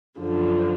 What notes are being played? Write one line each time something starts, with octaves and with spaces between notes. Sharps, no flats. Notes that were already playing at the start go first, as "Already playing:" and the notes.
F#2 D3 F3